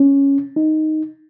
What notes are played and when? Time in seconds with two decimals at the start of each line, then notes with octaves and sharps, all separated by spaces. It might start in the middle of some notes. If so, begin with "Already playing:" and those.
Already playing: C#4
0.56 D#4